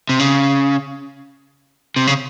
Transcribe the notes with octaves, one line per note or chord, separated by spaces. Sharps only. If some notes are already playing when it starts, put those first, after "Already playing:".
C3
C#3
C3
C#3